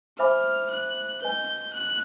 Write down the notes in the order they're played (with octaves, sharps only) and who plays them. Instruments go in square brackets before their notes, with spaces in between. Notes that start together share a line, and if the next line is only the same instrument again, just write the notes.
[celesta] C5 E5 G#5 B5 D6 [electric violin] F6
[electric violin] F#6
[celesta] B4 D#5 G#5 [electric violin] G6
[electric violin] F#6